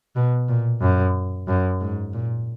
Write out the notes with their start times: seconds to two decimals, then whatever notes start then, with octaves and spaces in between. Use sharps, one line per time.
0.16 B2
0.49 A#2
0.82 F#2
1.48 F#2
1.81 G#2
2.13 A#2